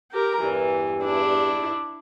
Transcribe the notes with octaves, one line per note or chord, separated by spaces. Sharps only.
G4 A#4
E2 G2 E3
D4 E4